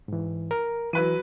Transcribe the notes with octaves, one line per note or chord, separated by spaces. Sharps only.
G#2 E3
A#4
E3 F#3 B4 D#7